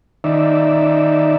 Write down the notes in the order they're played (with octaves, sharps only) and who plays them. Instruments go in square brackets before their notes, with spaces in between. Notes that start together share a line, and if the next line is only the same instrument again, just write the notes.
[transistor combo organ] D#3 D#4 D5 E5